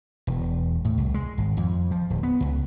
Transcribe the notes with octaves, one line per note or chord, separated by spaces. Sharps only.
E1
A2
C2
G#3
G#1
F2
F3
D1
B3
C#2